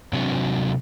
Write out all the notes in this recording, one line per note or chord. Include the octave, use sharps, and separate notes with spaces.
C3 F#3 C4 D4 F#4